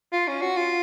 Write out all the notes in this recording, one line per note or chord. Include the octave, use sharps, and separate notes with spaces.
F4
C#4
F#4
F4